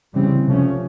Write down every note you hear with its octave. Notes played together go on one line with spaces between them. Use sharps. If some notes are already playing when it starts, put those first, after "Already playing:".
C#3 E3 G3 C4
C3 F3 A3 C#4